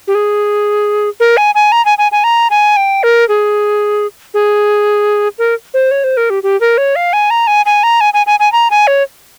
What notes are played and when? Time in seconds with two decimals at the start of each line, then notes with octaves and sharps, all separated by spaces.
0.08 G4
0.15 G#4
1.20 A#4
1.37 G#5
1.55 G#5
1.72 A#5
1.85 G#5
1.98 G#5
2.12 G#5
2.24 A#5
2.50 G#5
2.77 G5
3.03 A#4
3.29 G#4
4.34 G#4
5.38 A#4
5.74 C5
5.91 C#5
6.04 C5
6.17 A#4
6.30 G4
6.43 G4
6.61 A#4
6.78 C#5
6.96 F5
7.13 G#5
7.30 A#5
7.47 G#5
7.66 G#5
7.83 A#5
8.01 G#5
8.14 G#5
8.27 G#5
8.40 G#5
8.52 A#5
8.71 G#5
8.87 C#5